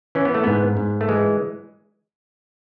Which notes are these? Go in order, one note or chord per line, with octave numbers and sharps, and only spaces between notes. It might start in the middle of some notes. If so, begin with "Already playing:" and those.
E3 C#4
B3
A3
G#2 B3
G#2
A3
E3 G#3